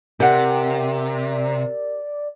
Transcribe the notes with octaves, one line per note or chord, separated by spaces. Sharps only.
C3 G4 A#4 D5 F#5